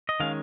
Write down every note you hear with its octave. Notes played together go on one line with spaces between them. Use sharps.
D#5
D#3 G#3 C#4 F5